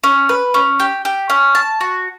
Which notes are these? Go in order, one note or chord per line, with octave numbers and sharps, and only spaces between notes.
C#4
B4
C#4
G4
G4
C#4
A5
F#4